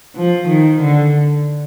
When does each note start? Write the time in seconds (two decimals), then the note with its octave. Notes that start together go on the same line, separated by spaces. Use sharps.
0.15 F3
0.48 D#3
0.82 D3